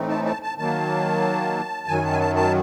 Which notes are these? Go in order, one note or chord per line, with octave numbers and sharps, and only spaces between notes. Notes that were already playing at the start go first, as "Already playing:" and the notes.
Already playing: A2 E3 A3 C4 D#4
A5
A5
A5
D#3 F#3 A#3 A5
F#2 D#3 F#3 G#5
A5
G#5
A5
A5